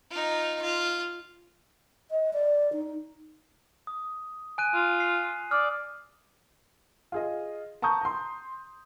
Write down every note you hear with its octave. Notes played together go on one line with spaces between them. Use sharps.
D#4 F4
F4
D#5
D5
D#4
D#6
G#5 F#6 D#7
F4
C7
D5 D#6 F6
F4 G#4 D#5
A5 A#5 C#6 D#6 G6
A#5 C6